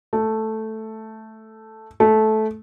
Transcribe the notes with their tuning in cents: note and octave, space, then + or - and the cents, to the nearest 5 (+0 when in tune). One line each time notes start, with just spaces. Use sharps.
A3 +0
A3 -15